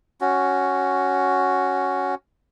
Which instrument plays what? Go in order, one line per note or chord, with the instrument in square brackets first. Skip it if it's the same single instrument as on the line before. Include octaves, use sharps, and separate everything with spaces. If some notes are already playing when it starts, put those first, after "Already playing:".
[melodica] C#4 F#4